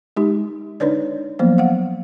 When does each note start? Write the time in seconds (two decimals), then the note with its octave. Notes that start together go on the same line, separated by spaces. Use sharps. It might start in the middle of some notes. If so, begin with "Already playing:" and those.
0.17 G#3 D#4 G4
0.80 D4 D#4 B4 C#5 D5
1.39 F3 F#3 A#3 B3 C5
1.58 F5 F#5